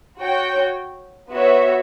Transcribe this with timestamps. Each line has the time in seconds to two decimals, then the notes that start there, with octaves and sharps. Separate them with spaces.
0.20 F#4 C#5 G5
1.30 B3 F#4 C#5 E5